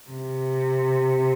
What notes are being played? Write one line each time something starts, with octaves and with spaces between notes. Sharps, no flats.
C3